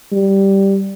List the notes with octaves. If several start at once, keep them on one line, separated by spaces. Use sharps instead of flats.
G3